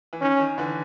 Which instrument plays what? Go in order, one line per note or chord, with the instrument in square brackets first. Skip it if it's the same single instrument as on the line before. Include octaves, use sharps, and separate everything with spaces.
[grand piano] E3
[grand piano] D#3 [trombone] C#4
[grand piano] D#3
D3 E3